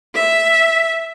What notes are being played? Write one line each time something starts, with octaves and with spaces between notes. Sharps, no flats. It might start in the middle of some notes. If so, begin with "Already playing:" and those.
E5